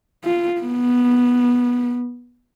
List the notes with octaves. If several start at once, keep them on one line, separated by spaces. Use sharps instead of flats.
F4
B3